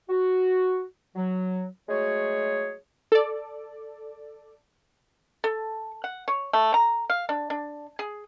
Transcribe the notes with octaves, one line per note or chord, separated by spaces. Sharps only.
F#4
F#3
F#3 G#3 A3 F#4 G#4 C#5
A4 D5
A4
F#5
C#5
A3
A#5
F5
D4
D4
G#4